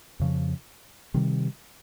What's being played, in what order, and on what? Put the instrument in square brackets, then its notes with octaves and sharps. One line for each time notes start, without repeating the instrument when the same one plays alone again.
[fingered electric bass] F2 C#3 F3
C3 D#3 G3